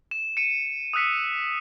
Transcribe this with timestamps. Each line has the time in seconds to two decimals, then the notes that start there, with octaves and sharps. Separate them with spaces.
0.11 E7
0.37 C#7 D#7 E7
0.93 D#6 E6 F#6 B6 C#7